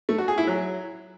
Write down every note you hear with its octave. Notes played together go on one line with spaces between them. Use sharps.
A3
F#4
G#4
E4
F#3